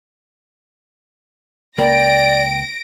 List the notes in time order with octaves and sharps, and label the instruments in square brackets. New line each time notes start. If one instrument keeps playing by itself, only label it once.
[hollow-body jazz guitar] C#2 A#3 [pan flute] D5 [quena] G5 [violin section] A#6 D7